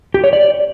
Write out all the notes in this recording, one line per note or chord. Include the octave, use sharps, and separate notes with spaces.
G4
C#5
D5